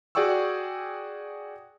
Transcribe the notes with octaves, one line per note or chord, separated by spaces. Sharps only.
F#4 G#4 D5 G5 C#6 E6